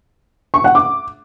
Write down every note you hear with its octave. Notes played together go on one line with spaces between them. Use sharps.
C#6
F#5
D6